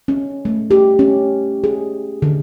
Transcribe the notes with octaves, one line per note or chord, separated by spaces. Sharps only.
C#4
A3
G4
C#4
G#4
D3